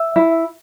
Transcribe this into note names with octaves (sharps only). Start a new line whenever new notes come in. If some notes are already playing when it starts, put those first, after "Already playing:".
Already playing: E5
E4